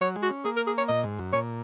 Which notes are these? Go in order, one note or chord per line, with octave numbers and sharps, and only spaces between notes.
F#3 C#5
G#3
F#4
C#4
A#3 G#4
A#4
G#4
C#5
A#2 D#5
G#2
F#2
A#2 C#5